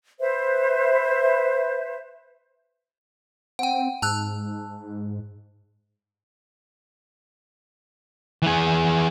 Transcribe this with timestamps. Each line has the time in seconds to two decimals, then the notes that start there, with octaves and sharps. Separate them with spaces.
0.20 B4 C5 E5
3.59 C4 F#5 G5
4.02 G#2 A5 E6 F#6
8.42 E3 G#4